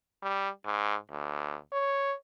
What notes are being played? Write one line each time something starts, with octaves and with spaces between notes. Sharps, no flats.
G3
G#2
D2
C#5